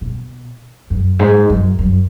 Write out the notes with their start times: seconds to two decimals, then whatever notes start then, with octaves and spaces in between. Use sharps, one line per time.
0.01 B2
0.90 F#2
1.19 G#2
1.50 F#2
1.79 F#2